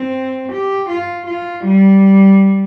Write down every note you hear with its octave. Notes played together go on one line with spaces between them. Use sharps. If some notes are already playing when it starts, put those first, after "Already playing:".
Already playing: C4
G4
F4
F4
G3